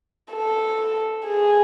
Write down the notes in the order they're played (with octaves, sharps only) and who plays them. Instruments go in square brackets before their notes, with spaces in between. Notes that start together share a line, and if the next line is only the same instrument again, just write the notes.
[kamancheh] A4
G#4